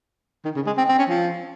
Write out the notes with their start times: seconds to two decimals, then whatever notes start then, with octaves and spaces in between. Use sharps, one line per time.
0.45 D#3
0.56 C#3
0.67 G#3
0.78 C4
0.89 C4
0.99 C#4
1.09 F3